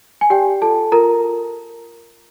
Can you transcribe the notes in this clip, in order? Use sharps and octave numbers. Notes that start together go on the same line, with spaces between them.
G#5
G4 D5 G5
F4 A4 A5
F4 A#4 A#5